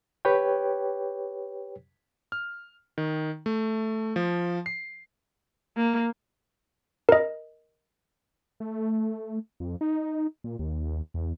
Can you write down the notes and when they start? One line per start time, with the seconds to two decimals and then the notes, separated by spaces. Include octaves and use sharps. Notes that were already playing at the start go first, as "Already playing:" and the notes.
0.25 G4 B4 C#5 G5
2.32 F6
2.98 D#3
3.46 A3
4.16 F3
4.66 C7
5.77 A#3
7.09 A#4 D#5
8.60 A3
9.60 F2
9.81 D#4
10.44 A#2
10.59 D#2
11.14 E2